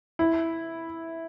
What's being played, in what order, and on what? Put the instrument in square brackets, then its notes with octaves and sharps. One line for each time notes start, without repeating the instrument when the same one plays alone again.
[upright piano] E4